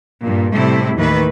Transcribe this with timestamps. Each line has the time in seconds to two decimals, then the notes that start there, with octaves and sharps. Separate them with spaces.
0.23 G2 A#2
0.53 A2 C3 G3 A3 E4
0.97 D#2 A2 D#3 E3 B4